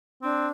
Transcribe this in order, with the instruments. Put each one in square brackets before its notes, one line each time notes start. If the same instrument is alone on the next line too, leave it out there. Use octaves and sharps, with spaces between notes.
[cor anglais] C4 [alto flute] D4